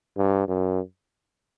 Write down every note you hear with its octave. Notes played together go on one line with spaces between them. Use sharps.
G2
F#2